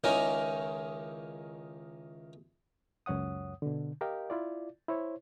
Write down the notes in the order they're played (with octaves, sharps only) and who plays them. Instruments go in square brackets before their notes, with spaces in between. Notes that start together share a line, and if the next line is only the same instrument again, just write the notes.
[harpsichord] C#2 D#3 C#4 D#4 E4 A#4
[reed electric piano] C#2 F#2 C#5 F#5 D#6
B2 D3
G4 A#4 D#5 F5 G5
E4 F4 D5
E4 C5 C#5